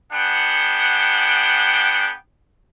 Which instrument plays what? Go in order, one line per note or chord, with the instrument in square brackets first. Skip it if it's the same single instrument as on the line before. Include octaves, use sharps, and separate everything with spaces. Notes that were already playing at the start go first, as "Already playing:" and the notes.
[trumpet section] B3 D4 G#4 F#5 G5